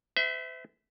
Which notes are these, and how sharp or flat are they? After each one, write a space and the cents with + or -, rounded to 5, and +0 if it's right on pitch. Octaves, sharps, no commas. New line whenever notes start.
C5 -45 E5 -10